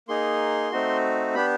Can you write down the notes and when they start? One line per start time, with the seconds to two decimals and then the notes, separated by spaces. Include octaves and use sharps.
0.08 A#3 D#4 G#4 C6
0.72 A3 C4 D#4 F#4
1.35 B3 D4 G4 B5